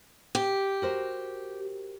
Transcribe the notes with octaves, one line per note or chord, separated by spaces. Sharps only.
G4
F#4 A#4 C5